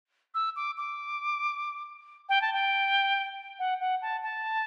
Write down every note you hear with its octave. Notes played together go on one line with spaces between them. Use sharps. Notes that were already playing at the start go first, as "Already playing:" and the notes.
E6
D6
D6
G5
A5
G5
F#5
F#5
A5
A5